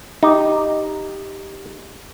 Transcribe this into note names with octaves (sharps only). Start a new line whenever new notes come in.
D#4 G4